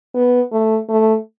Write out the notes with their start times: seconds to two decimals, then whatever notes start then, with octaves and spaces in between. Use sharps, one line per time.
0.15 B3
0.52 A3
0.89 A3